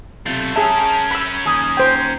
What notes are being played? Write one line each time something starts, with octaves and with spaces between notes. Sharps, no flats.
B1 C3 A3 F4
C#4 G#4 A#4 E5 A5
B5 E6
D#2 G#4
C5 G5